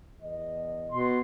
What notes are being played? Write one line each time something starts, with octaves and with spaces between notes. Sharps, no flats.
E2 D#5
B2 C6